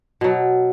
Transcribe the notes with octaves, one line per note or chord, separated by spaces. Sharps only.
B2 F#3